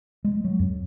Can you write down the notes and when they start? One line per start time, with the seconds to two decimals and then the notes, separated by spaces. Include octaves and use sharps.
0.24 G#3
0.44 F#3
0.59 F2